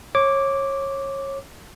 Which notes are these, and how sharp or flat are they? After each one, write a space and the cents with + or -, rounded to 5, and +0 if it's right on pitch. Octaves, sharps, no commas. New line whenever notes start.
C#5 -25 D6 -5